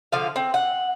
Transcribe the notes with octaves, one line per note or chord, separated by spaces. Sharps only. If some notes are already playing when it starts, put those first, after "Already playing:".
D3 F3 F5
C4
F#5